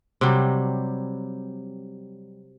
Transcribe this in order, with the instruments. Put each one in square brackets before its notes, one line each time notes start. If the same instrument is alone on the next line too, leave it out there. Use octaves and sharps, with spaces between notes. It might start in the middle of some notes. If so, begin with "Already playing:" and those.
[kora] C3 F#3 G3